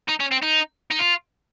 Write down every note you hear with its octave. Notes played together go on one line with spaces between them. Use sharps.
D#4
C#4
C4
D#4
D#4
F4